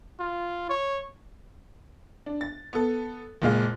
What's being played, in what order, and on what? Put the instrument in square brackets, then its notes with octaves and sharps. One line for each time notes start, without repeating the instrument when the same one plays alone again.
[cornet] F4
C#5
[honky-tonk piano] D4
A6
B3 A4
F#1 A#2 G#3 F5